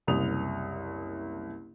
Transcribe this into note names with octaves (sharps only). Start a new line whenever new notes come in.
F#1 C2 D#6 F7